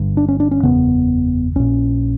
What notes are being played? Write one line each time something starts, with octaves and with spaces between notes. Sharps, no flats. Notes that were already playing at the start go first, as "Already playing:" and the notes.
Already playing: G1 G2 D3
D4
C#4
D4
C#4
F#1 E2 C#3 B3
A#1 A#2 C#4